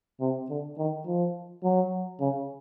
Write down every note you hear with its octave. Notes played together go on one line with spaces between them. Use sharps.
C3
D3
D#3
F3
F#3
C#3